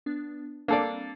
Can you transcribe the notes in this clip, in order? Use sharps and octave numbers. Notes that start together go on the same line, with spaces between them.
B3 D4
G3 A#3 C4 D4 A4 D5